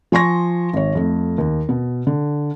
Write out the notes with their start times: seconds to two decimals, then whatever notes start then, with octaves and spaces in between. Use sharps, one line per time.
0.12 F3 G#5 C6 C#6 A#6
0.73 G#1 C#5
0.95 F2 A3
1.38 D#2
1.69 B2
2.07 D3